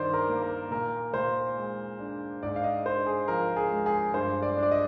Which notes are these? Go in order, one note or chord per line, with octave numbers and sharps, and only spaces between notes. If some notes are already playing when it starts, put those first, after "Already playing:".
Already playing: G2 D#3 D#4 C5 D5
A#4
A#3
A#4
A#2 A#4
A#2 C5
G#3
D4
G#2 D5
F5
D#5
D4 C5
G#4
F3 A#4
G#4
G#3
G#4
G2 C5
D5
D4
D5
D#5